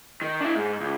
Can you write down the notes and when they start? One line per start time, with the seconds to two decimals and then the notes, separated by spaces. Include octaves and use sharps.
0.22 D#3
0.41 D4 E4
0.56 G#2
0.81 C#2